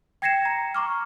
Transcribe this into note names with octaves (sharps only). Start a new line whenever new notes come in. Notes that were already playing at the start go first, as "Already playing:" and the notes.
G5 G#6 A#6 C7 C#7 E7
A#5
A#5 C#6 D6 F6